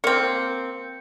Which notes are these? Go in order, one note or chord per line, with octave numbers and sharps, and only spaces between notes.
A#3 C4 C#7